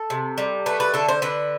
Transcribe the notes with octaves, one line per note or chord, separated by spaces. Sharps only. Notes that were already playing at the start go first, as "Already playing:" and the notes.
Already playing: A4
C3
G3
A3 B4
B4
D3 A4
C5
D3 B4